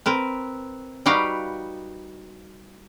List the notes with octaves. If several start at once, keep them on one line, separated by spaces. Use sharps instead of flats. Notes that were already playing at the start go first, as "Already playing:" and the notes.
C4 A#4 B4
G3 D#4 F#4 G4 B4 F5